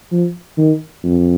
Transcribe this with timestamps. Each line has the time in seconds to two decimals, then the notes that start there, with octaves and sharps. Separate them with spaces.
0.11 F3
0.57 D#3
1.03 F2